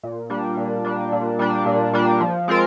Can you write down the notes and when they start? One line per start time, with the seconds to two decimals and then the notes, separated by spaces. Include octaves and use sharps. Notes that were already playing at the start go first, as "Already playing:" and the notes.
0.03 A#2
0.30 G3 A#3 D4
0.57 A#2
0.85 G3 A#3 D4
1.12 A#2
1.39 G3 A#3 D4
1.66 A#2
1.94 G3 A#3 D4
2.21 F3
2.48 G#3 C4 F4 A#4